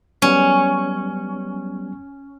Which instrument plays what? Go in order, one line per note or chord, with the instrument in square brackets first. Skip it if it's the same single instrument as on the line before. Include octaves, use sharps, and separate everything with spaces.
[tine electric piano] F#3 G3 B3 [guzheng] C#4